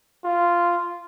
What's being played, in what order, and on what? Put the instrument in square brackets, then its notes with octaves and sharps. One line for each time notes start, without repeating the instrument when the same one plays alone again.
[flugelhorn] F4